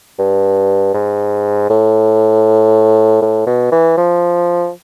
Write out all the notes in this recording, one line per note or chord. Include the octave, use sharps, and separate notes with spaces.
G2
G#2
A2
A2
B2
E3
F3